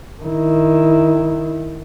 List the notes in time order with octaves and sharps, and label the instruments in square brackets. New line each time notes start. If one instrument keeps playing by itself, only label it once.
[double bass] D#3 E4